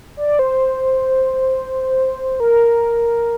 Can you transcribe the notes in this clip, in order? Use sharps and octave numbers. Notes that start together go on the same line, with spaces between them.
D5
C5
A#4